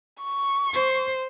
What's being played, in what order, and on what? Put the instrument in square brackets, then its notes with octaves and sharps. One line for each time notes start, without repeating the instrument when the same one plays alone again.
[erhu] C#6
[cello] C5